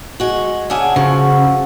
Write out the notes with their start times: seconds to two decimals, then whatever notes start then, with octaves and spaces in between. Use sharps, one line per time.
0.20 G#3 F#4
0.70 C#3 D4 G#4 E5 F#5 D#6
0.96 C#3 F3 F#4 C#6